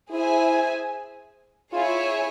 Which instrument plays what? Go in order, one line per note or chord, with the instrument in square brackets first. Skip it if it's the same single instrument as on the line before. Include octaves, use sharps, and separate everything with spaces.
[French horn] E4 [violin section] G#4 C5 E5 G#5
[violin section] E4 G#4 C#5 E5 G#5 [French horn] F4